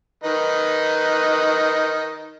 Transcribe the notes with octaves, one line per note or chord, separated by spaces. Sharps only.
D#3 D#4 B4